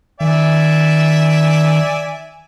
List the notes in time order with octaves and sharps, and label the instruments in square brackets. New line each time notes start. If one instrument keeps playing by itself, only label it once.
[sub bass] D#3 [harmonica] D5 E5 G#5